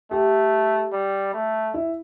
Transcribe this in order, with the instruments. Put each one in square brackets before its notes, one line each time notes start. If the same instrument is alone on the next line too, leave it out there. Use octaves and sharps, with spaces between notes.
[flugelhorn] A3 [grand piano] G4
[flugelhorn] G3
A3
[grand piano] E4